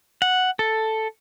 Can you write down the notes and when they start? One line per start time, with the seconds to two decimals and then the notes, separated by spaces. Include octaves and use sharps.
0.22 F#5
0.59 A4